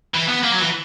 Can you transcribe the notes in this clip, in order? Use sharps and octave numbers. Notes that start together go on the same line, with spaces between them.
E3
B3
A#3
F#3
E3